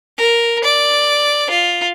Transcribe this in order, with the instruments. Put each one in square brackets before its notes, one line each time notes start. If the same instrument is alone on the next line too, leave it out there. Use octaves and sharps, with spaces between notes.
[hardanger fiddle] A#4
D5
F4